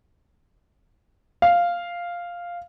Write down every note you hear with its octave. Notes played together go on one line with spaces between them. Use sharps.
F5